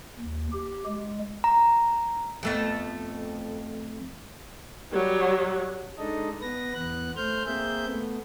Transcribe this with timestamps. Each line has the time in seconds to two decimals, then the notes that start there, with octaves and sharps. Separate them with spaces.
0.19 D#2
0.53 G4
0.86 G#3
1.44 A#5
2.43 F2 A3 B3
4.91 F#3 G3
5.98 G#3 D4 D#4 A4 D#5
6.41 B3 B4 A#6
6.74 E2 B3 F#6
7.16 A3 C5 F6 G6
7.46 A#3 C4 G#4 E5 G6
7.87 A3 B3